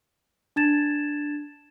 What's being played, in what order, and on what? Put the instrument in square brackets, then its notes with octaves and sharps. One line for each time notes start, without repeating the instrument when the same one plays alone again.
[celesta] D4 A5 G#6 A6 E7